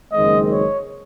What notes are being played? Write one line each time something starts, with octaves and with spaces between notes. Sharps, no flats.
F#1 F#2 D#3 G#3 C4 D#5
C#5